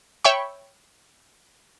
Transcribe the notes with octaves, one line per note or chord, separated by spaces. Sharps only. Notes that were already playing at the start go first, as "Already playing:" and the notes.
C#5 E5 G5 B5 C#6